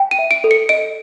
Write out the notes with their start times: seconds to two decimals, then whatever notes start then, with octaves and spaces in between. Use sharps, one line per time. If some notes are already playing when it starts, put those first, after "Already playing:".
Already playing: G5
0.11 D#7
0.19 E5
0.31 D7
0.44 A4
0.51 C#7
0.69 D#5 D7